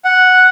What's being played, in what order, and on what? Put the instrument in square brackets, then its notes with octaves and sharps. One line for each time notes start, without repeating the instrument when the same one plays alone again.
[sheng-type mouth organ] F#5